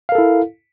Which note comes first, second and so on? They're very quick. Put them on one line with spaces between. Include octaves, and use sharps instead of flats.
F5 A#4 A4 E4